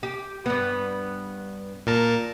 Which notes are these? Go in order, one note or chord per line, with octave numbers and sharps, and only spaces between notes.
G4
G2 B3
A#2 A#4 A5